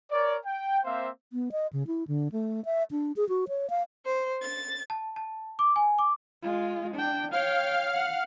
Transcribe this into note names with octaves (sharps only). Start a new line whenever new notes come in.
A#4 C#5 D5
G5
A#3 C4 C5 E5 F5
B3
D#5
C#3
E4
D3
A3
E5
D4
G#4
F#4
C#5
F5
C5
A6
A5
A5
D6
G#5
D6
G#3 F4
D4 G5
C#5 F5 G5 F6
F#5